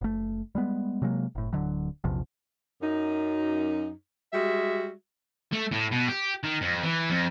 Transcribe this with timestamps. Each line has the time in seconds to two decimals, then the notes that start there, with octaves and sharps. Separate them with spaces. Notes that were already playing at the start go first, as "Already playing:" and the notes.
0.01 F#1 A3
0.55 G3 G#3 B3
1.02 C3 F#3 G#3 A#3
1.35 F#1 A2
1.53 D1 C2 D3 F#3
2.04 A#1 E2 C3 F3
2.82 F#2 D#4
4.33 G3 G#3 F#4 E5
5.52 A3
5.72 A2
5.91 B2
6.08 G4
6.43 D#3
6.61 F2
6.83 E3
7.10 F2